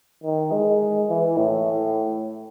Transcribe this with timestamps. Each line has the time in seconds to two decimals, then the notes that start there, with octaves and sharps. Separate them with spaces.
0.23 D#3
0.52 G#3
1.09 E3
1.37 A2